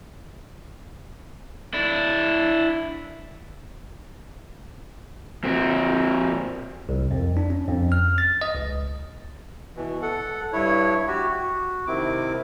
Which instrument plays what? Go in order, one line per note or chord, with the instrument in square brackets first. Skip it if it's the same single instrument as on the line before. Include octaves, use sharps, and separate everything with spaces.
[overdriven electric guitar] D4 E4
[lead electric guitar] A#2 C4
[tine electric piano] C2
F2
D4
C#4
F2
F6
A6
D#5
C#2
[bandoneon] B2 E3
A4 F#5
G2 E4 C#5
F#4 G4
F#4
C3 D#3 C4 E4 D6